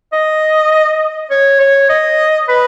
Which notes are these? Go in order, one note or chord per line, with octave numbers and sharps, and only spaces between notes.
D#5
C#5
C#5
D#5
B4